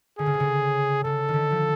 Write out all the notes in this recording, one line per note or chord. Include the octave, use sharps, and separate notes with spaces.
D3 G#4
C#3
C3
C#3
C#3 A4
D#3
D3
F3